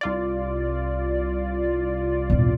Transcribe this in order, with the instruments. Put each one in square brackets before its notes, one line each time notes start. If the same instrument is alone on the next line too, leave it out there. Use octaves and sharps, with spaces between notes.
[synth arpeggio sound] C2 F4 D5
[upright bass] E1 A2